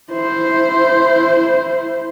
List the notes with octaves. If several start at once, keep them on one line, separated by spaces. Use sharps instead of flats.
E4 C5